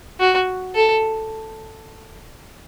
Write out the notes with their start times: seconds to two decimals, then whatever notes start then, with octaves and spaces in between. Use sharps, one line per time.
0.20 F#4
0.75 A4